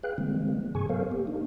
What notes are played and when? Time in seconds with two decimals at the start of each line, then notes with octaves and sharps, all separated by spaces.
0.03 G#4 B4 F5 G5 F#6
0.18 D3 E3 G3 G#3 A#3 C4
0.75 G2 C3 G#4 G#5 C#6
0.89 F#3 B3 A4 A#4 C5 F5
1.12 A#3 G4
1.27 A#3 D4 D#4